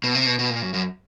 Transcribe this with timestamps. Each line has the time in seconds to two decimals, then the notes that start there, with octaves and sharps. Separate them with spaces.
0.04 B2
0.15 C3
0.26 B2
0.39 B2
0.50 A#2
0.62 F#2
0.74 F#2